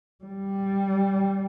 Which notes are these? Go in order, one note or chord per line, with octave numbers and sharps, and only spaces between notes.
G3